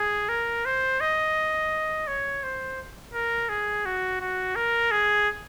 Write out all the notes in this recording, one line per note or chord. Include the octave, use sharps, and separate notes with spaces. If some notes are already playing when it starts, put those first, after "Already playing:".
Already playing: G#4
A#4
C5
D#5
C#5
C5
A#4
G#4
F#4
F#4
A#4
G#4